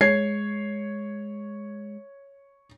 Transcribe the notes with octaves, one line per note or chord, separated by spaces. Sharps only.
G#3 C#5 G#6 C7